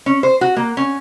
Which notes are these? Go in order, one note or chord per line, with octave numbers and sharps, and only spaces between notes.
C#4
C5
F#4
A#3
C#4